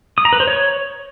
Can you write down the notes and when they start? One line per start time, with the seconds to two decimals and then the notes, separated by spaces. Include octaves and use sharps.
0.18 D#6
0.25 A#5
0.33 B4
0.40 C5
0.47 C#5